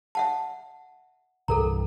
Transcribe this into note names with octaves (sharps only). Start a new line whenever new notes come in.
E5 F#5 A5
C2 G2 E3 A4 A#4 A#5